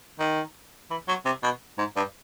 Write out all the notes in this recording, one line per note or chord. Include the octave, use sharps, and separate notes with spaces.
D#3
E3
F#3
C3
B2
G#2
G2